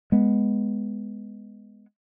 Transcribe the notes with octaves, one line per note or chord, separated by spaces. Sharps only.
G#3 B3